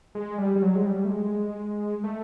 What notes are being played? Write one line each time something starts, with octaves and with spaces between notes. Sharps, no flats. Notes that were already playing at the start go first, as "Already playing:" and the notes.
G#3
G3
G3
F#3
G#3
G3
A3
G#3
A3